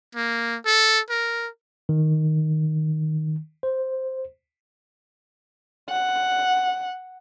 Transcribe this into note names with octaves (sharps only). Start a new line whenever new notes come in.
A#3
A4
A#4
D#3
C5
F#5